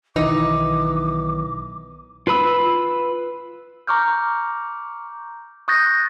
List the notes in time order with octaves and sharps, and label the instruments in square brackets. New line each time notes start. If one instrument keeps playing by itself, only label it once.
[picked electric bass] B1 D#3 E3 [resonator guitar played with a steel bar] D#4 [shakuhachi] D6
[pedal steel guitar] F4 B4 B5 E6
[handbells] A#5 C#6 D6 F6 G6
C#6 D#6 F#6 G6 A6 A#6